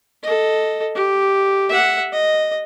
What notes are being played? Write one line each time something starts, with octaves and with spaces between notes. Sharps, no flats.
A4 D#5
G4
E5 F#5
D#5